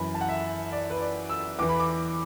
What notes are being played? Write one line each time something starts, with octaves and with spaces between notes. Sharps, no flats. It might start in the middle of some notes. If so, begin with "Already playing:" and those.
Already playing: F#2 E3 B5
A5
F#5
E5
D5
B4
D5
E6
E2 E3 D6
B5
D6